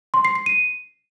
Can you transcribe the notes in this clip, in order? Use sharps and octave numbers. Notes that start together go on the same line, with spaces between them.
C6
C7
C7
D#7